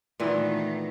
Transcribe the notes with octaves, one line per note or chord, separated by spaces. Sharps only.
A#2 D#3 E3 A3 B3